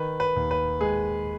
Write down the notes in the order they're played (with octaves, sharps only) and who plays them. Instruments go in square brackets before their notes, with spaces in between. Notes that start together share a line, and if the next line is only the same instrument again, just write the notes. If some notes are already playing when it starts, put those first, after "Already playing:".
Already playing: [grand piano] D#3 B4
B4
D#2
B4
G#3 G#4